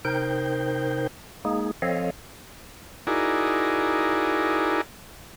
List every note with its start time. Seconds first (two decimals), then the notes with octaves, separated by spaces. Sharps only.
0.05 C3 D#4 A#4 C5 G5 G6
1.45 G#3 A#3 D#4 G#4
1.82 F3 C4 A4 C#5 D#5 F5
3.07 D#4 E4 F#4 G#4 A#4 D5